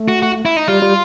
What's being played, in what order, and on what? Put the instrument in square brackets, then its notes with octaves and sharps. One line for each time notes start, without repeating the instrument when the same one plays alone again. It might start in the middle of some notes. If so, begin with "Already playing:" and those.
Already playing: [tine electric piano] A3
[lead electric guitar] F#4
F#4
E4
D#4
[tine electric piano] G3 [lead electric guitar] F4
[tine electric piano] G3